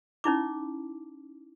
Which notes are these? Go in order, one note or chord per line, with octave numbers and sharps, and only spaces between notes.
C#4 D#4 E4 D6